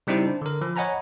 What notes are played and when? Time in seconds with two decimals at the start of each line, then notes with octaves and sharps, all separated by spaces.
0.07 C#3 G3 C4 D#4 E4 C5
0.26 D4
0.42 D3 A#4
0.61 F3
0.76 C#5 D#5 F#5 G#5 A#5 B5